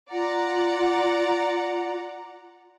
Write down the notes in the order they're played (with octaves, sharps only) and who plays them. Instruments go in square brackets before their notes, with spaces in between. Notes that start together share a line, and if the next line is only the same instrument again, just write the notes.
[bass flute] F4 [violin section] D5 F#5 A#5